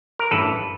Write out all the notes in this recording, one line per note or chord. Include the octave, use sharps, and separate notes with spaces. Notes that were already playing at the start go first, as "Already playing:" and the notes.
A#4
A1 G2 E3 A4 B4